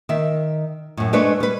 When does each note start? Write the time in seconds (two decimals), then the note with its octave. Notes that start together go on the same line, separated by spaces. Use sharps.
0.09 D#3 E5
0.97 F#2 A2
1.13 G#3 A3 D4 B4 C#5
1.40 G3 B4